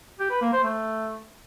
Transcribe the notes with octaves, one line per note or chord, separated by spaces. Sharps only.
G4
B4
A#3
C5
A3